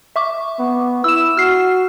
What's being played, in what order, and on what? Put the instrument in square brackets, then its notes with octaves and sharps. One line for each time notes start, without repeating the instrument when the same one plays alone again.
[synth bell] E5 C#6 D6
[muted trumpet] B3
[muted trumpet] E4 [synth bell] E6 E7
[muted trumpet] F#4 [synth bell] F6 C7